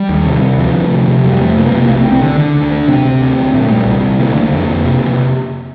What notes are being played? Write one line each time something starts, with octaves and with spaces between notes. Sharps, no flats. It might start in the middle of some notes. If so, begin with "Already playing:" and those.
Already playing: G3
D#2
C3
C3
D2 F3
D2
C3
C3
F2 G3
F2 A3
C3 A#3
A#3
C3
A#3
C2 A3
C4
C2
C4
D3 D4
D3
D2
D2
C3 C4
C3
D2
D2
A#2 A3
A#2 G3
C2
C2
D3 A#3
A3
D3 A#3
F2
F2
C3
C3